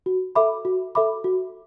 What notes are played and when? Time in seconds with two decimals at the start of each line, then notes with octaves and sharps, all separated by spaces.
0.06 F#4
0.35 A4 E5 B5 D6
0.65 F#4
0.95 A4 E5 B5 D6
1.24 F#4